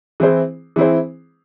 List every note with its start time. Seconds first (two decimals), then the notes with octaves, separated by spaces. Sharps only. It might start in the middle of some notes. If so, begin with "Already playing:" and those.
0.20 E3 C4 E4 G#4 C5
0.76 E3 C4 E4 G#4 C5